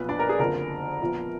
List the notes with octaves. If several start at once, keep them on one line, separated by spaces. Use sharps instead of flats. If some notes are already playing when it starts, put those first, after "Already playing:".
Already playing: B1 A#2 F3 B3 B4
D4 D5
A#4
G#4
F#1 F2 D3 A#4
A#1 A#2 F3 B3